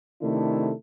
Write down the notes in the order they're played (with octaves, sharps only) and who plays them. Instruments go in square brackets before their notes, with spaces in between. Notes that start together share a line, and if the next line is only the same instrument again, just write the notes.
[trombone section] C3 D#3 A3 D4 E4 A4